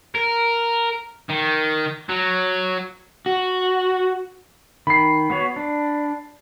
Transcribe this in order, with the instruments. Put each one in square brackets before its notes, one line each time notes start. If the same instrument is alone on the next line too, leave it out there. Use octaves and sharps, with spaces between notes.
[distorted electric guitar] A#4
D#3
F#3
[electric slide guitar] F#4
[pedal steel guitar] D#3 [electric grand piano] B5 C7
[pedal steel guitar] B3 F#4 C#5
D4